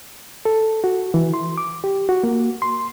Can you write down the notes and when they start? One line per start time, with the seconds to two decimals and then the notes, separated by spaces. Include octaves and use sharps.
0.45 A4
0.84 F#4
1.14 E3
1.34 C6
1.58 D6
1.84 G4
2.09 F#4
2.24 A#3
2.62 C6